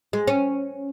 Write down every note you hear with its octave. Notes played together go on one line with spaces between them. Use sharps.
G#3
C#4